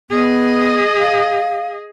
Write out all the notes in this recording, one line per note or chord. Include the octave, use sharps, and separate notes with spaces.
B3 G#4 D#5
F5